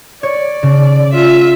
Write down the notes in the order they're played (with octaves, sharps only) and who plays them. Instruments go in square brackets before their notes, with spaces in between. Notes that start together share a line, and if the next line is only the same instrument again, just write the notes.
[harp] C#5 [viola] D5
[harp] C#3
[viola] F4 E5